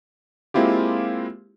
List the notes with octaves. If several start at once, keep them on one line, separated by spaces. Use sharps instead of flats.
G#3 A#3 C4 E4 F4 G4